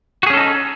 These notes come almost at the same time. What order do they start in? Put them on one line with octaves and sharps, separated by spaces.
F#4 G#4 C#4 A4 D#4